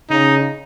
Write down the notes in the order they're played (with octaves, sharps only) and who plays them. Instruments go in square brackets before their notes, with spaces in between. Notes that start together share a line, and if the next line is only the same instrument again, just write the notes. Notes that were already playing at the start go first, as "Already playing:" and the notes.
[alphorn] C#3 [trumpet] D#4